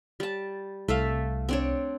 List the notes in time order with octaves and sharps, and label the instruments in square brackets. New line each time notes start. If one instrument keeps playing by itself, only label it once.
[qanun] G3 A5
[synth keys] C2 [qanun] A3 E5 F5
[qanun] C4 D4 C#5